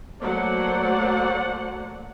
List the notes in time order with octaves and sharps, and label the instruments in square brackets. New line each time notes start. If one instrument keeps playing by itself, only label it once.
[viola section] F#3 A3 A#3 C5 D5 F#5